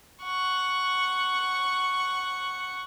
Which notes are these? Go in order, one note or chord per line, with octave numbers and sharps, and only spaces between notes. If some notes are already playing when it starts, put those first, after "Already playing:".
F#5 C#6